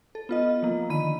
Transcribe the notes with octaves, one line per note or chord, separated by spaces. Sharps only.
A4
B3 F4 D#5
F3 A#3
D3 D#3 B5 D#7